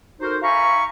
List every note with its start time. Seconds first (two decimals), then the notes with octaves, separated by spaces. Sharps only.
0.20 D#4 F#4 A4 A#4 C5
0.42 E5 F5 G#5 A#5 B5 C#6